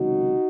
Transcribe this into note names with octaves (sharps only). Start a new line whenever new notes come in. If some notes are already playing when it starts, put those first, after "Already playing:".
Already playing: C#2 C3 D#3 F#3 D#4 F#4